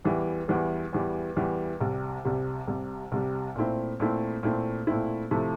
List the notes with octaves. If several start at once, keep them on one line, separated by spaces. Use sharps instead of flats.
E2 E3 G3
E2 E3 G3
E2 E3 G3
E2 E3 G3
C2 C3 G3
C2 C3 G3
C2 C3 G3
C2 C3 G3
A#2 A3 C4 E4
A#2 A3 C4 E4
A#2 A3 C4 E4
A#2 A3 C4 E4
C3 F3 A3 E4